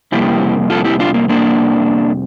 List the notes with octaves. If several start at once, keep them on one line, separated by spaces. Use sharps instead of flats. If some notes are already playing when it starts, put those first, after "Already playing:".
F2 C3 G3 A#3 E4 G4
F4 A4
E4 G4
D4 F4
A#3
A#3 D4